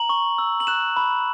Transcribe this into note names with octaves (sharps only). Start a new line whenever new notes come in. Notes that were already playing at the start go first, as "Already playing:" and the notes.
Already playing: A#5 F#7
C#6
E6
F#7
F#6 E7
B5